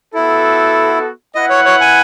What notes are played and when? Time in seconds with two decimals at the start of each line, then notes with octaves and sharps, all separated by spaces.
0.14 B3 E4 F#4 A4
1.35 E4 B4 D#5 F#5
1.50 C#5
1.65 C#5
1.81 G#5